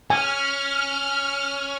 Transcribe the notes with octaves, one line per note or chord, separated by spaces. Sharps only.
C#4 G#5 F6